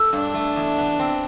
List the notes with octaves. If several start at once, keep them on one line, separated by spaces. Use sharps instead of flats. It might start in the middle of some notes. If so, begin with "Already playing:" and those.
Already playing: A4
G2 D4
A3
E2
B3
C4